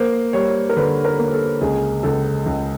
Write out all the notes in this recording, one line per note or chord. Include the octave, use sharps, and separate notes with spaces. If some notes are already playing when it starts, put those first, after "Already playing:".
Already playing: A#3 C5
G3 C#5
A#4
D3 B4
A#4
A#3
A4
C#2 G#4
C#2 A4
C#2